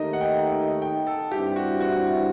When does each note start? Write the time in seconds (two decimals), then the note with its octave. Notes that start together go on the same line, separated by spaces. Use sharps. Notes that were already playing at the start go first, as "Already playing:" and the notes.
Already playing: D#2 D#3 A3 D#4 D#5
0.13 F#5
0.21 G5
0.82 G5
1.07 A4
1.31 G2 E3 G3 C4 E4 G4
1.56 F#4
1.81 F#4